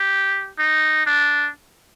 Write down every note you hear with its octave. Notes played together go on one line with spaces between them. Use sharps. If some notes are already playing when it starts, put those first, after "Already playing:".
Already playing: G4
D#4
D4